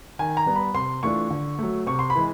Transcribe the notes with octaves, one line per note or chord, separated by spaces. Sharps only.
D#3 G#5
A#5
G3 B3
B5
C3 C6
E3 A3 D4 F4 C#6
D3
F#3 A3
C3 C#6
C6
B5
E3 G#3